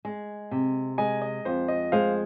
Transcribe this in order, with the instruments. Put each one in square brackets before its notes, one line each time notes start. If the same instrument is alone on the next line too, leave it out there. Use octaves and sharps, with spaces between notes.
[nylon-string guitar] G#3
C3
[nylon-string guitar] G#3 [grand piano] D#5 G#5
[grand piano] D#5
[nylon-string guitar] F2 [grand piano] C5
[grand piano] D#5
[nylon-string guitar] G#3 [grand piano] C5 F5